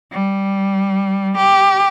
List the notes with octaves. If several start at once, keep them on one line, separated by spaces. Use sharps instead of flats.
G3
G4